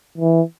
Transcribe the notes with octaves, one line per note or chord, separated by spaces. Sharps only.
E3